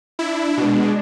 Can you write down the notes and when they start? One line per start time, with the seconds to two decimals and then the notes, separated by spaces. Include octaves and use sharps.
0.19 D4 E4
0.57 B2 G#3 D4